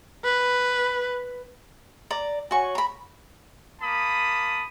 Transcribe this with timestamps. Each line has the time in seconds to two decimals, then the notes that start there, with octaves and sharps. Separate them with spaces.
0.24 B4
2.10 D5 A#5
2.51 F#4 C#5 G#5 C#6
2.75 A#5 B5
3.81 A#3 A5 B5 D#6